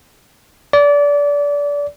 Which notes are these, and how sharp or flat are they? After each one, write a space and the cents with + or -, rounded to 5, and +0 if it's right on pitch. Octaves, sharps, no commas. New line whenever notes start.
D5 -25